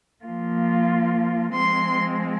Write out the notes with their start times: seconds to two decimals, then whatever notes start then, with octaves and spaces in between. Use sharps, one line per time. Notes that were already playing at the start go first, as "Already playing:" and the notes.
0.25 F3 A#3 F4
1.54 F3 G#3 C4 C6